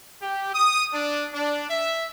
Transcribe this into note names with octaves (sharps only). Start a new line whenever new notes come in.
G4
D#6
D4
D4
E5